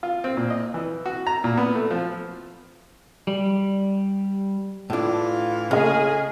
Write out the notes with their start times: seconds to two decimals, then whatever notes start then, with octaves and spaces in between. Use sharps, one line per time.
0.03 F4
0.24 C4
0.37 A#2
0.50 D#5
0.74 E3
1.06 F#4
1.27 A#5
1.44 A#2
1.57 B3
1.75 A3
1.91 F3
3.27 G3
4.90 A2 E3 D4 F4
5.71 C#3 A3 G#4 D#5 F6